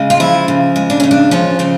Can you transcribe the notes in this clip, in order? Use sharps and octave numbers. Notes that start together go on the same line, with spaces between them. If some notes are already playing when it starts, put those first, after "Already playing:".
Already playing: C#3 G#3
F4
F3 E4
C#3
G#3
D4
C#3 C#4
D4
F3 C#4
C#3 C4